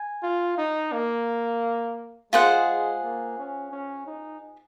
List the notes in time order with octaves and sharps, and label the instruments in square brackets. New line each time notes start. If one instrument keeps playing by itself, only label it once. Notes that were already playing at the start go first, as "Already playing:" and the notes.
Already playing: [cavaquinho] G#5
[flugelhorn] F4
D#4
A#3
[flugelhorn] G#3 [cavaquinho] F4 G#4 C5 F#5
[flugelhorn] A#3
C#4
C#4
D#4